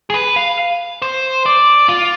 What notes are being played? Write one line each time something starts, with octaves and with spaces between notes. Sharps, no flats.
G#4
B4
F5
C5
D5
F4